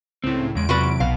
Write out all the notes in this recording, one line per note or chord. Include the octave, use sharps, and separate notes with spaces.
C#2 A2 C4
E2 C#3 G#3 D7
C3 F#3 F4 F#4 B4
B1 B2 F5